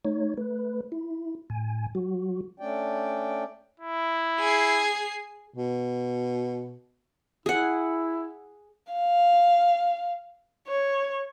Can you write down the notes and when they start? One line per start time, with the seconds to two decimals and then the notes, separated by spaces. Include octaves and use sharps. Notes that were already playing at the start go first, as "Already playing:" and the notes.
0.05 A3 D#4 C#5
0.37 A3 B4
0.92 E4
1.50 A2 G#5
1.95 F#3 F#4
2.60 A3 C#4 D4 D5 G5
3.80 E4
4.39 G#4 C7
5.54 B2
7.46 E4 G#4 F#5
8.93 F5
10.68 C#5